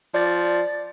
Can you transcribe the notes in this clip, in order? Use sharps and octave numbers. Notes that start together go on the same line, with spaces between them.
F3 D5 A6